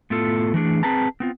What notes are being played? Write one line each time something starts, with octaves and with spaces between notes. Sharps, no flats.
A2 A3 B3 F4 A4
E3 A3 D4 G#4
C4 G#4 B4 A5 A#5
B3 C4 F4